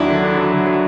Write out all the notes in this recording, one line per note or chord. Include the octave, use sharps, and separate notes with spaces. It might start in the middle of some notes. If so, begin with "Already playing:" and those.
Already playing: D#2 F#3 D4 E4
D3
D3
F#3
D3
F#3